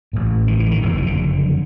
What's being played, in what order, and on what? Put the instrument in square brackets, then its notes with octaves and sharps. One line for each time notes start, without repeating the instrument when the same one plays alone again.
[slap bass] A1 A2
D#3
E3
D#3
F#1 F2 C#3 F3
D#3
D3